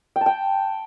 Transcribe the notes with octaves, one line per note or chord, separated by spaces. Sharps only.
G5
A5
G5